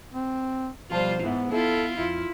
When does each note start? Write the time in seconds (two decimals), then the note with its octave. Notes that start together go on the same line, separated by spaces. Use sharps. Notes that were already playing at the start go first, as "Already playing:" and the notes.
0.14 C4
0.91 B1 F3 G3 F4 C5 A5
1.23 G#2 B3 E4 B4 E5
1.52 B3 E4 F4 A4
1.98 F2 E4 F4